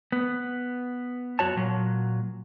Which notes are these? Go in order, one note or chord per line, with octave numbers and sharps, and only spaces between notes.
B3
F#2 F#4 C#5 A5
A#2 F#3